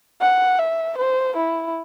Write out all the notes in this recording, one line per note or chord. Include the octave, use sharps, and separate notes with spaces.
F#5
E5
C5
E4